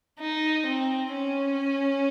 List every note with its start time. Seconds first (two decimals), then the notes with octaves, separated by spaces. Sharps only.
0.20 D#4
0.66 C4
1.13 C#4